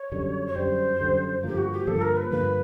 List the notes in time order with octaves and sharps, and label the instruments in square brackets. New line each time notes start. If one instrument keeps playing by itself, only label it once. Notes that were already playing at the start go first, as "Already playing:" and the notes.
Already playing: [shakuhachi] C#5
[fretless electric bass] F#2 D3 G3
[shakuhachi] C#5
[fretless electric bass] F#2 D3 G3 [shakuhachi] C5
[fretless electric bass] F#2 D3 G3
[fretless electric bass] G2 D3 F3 A#3 [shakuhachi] G4
[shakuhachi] F#4
G4
[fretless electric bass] G2 D3 F3 A#3 [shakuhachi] A4
[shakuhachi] A#4
B4
[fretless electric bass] G2 D3 F3 A#3 [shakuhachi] B4